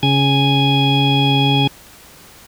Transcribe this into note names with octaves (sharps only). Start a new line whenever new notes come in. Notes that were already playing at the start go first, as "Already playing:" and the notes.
C#3 G#5 G#6